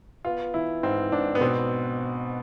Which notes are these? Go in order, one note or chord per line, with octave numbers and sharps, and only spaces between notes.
B3 F4
E3 E4
G#2 C4
G#2 D4
B3
B2 C4